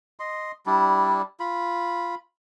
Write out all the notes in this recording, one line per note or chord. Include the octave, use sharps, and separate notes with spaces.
D#5 C6
G3 D4 E4
F4 B5